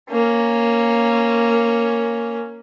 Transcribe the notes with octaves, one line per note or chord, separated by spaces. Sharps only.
A#3 C#4